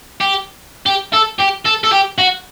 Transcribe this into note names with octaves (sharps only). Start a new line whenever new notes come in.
G4
G4
A4
G4
A4
A4
G4
F#4